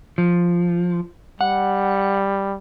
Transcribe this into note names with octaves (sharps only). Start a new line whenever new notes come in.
F3
G3 F#5